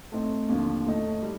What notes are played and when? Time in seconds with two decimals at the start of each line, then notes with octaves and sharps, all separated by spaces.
0.12 A2 A3 C4 D#4
0.49 D#2 D3 F3
0.85 A2 A3 D#4
1.22 G3